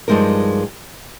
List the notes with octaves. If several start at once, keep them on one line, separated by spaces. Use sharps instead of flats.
G2 F3 G#3 D#4 A#4